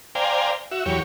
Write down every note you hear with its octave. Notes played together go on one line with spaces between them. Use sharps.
C5 D5 F5 G5 G#5 A#5
F#4 E5
E2 F#3 G4 C#5